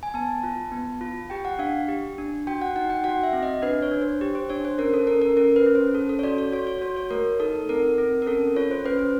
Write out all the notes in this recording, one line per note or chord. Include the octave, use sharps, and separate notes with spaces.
G#5
B3 A5
F4
B3
F4
G4 G5
F#5
D4 F5
G4
D4
F#4 G5
F#5
D#4 F#5
G5
F#4 F#5
E5
C4
D#5
D4 B4
C#5
D4
C5
G4
C5
D4 C#5
C5
C#4 A#4
A4
C#4 A#4
A#4
C#4 A#4
B4
C#4
C5
A4
A4
C#5
F#4 D5
C#5
F#4 C#5
C#5
F#4 C#5
C#5
A3 A#4
D#4 A4
C4 A#4
C4
A#4
C#4 A4
F4 C#5
C5
C#4 B4
C5